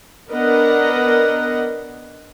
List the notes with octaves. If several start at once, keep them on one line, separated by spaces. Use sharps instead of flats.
B3 D4 A#4 B4 D#5 F#5